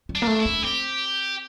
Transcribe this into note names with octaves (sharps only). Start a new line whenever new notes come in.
G3
D4
A#3
A3
E4
D4
C4 G4